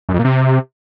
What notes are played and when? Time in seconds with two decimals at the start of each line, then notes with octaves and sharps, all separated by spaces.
0.09 F#2
0.14 F2
0.19 A#2
0.25 C3